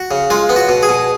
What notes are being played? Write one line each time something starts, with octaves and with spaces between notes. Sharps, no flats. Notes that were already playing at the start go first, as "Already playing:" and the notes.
Already playing: F#4
C#3
G#3 F4
B3
F#4
B2
G#4
B2